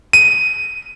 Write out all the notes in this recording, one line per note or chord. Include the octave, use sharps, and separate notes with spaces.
D#7